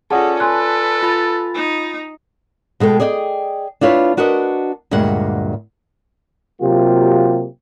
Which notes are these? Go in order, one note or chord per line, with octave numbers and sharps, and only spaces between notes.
C#4 F4 G#4 A4 D5 F#5 A5 D#6
A4 B4 G#5 C6 F#6
F4 B5 A6
D#4
B2 G#3 A4 G5
G#4 D5 D#5 F#5 G5
D4 E4 F4 B4 C#5
D4 F#4 A#4 B4 D#5
D2 G2 A#2 G#3 F#5
C3 F#3 A#3 F4 G4